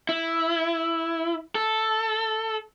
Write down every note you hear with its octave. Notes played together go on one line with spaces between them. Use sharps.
E4
A4